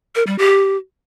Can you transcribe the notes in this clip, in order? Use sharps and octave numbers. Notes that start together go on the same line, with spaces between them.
A#4
G3
G4